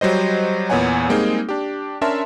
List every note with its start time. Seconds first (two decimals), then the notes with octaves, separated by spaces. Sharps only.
0.01 F#3 G3 C5 D#5
0.70 E2 A#2 B3 C#5 F#5 G#5
1.09 G3 G#3 A#3 C4 D#4 G#4
1.49 D4 G4
2.01 C#4 D4 A#4 E5 A5 C6